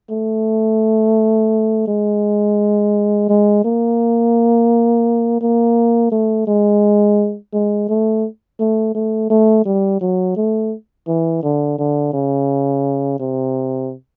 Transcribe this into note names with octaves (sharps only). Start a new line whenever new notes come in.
A3
G#3
G#3
A#3
A#3
A3
G#3
G#3
A3
A3
A3
A3
G3
F#3
A3
E3
D3
D3
C#3
C3